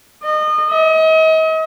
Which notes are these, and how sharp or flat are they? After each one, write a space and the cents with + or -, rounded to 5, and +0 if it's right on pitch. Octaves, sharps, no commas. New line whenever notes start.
D#5 -30
D#5 +40